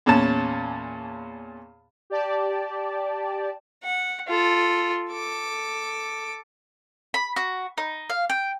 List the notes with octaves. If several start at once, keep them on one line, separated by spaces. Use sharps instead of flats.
E2 A#2 C#4 A5
G4 D5 A5
F#5
F4 A4
A4 D6
B5
F#4
D#4
F5
G5